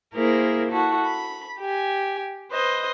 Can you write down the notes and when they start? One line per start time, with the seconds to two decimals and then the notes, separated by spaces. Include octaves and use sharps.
0.15 A#3 E4 G#4 A#4 C5
0.71 E4 F#4 A4
1.06 B5
1.61 G4 G#5
2.50 B4 C5 D#5